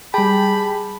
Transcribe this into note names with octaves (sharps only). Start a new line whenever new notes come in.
G3 G#4 G5 A5 B5